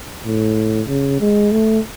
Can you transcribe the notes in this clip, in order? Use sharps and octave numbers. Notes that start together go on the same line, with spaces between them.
A2
C#3
G#3
A3